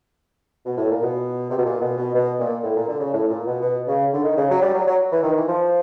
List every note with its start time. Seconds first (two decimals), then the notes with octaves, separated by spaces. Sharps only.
0.65 B2
0.77 A2
0.91 A#2
1.02 B2
1.50 C3
1.57 B2
1.65 A#2
1.81 B2
1.98 B2
2.14 B2
2.39 A#2
2.63 A2
2.76 A#2
2.87 D3
3.00 C#3
3.13 A2
3.29 A#2
3.46 B2
3.62 B2
3.87 C#3
4.12 D3
4.24 D#3
4.37 C#3
4.50 F#3
4.61 G3
4.74 F#3
4.87 F#3
5.11 E3
5.23 D#3
5.36 E3
5.48 F3